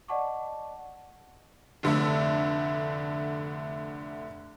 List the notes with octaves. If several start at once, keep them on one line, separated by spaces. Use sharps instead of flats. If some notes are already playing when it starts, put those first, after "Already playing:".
D5 D#5 F#5 A5 C#6 D6
F1 D3 A3 E5